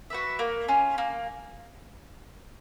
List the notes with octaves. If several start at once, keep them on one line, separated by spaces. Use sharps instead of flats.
F#4 B4 E5
A#3
C#4 F4
A#3